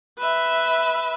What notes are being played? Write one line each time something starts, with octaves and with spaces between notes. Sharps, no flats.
B4 E5